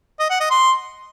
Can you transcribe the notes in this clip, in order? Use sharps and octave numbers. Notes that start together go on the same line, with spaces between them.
D#5
F#5
D#5
C6